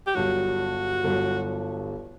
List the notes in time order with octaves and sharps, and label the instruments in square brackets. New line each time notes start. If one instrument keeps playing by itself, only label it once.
[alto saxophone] G4
[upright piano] G1 G2 F#3 [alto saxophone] F#4
[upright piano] G1 G2 F#3